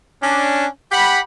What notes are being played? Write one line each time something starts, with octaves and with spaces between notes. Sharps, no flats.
C#4 D4
G4 F#5 B5